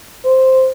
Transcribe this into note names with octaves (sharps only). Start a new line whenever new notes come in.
C5